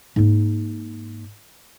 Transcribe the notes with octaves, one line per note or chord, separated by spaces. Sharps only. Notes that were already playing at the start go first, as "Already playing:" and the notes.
G#2 A#3